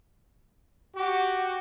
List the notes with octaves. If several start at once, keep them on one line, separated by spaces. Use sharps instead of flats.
F#4 G4